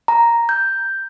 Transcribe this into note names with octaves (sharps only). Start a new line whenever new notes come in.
A#5
G6